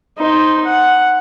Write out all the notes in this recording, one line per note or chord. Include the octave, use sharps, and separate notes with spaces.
D#4 C5
F#5